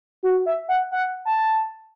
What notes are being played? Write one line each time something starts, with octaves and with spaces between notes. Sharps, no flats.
F#4
E5
F#5
F#5
A5